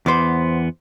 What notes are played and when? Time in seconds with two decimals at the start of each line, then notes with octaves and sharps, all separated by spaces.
0.06 E2 B3 C5 D6